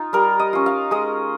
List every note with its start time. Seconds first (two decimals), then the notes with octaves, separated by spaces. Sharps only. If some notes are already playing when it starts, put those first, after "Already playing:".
Already playing: D#4 F4
0.13 G3 A#4
0.40 D#5
0.53 C#4 F4
0.66 F5
0.91 G#3 D#5